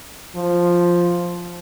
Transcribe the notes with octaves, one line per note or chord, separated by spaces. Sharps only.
F3